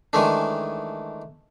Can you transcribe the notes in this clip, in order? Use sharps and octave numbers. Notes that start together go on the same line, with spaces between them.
D#3 E3 G#3 A3 D4